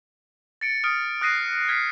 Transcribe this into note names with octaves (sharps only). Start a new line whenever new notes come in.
A6 C#7 D7
D#6 F6 D7
D#6 F#6 A#6 C7 D#7
F6 G#6 B6 C7